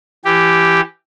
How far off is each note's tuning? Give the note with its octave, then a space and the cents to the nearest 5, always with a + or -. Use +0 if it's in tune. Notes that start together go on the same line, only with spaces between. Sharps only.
E3 +20 G4 +0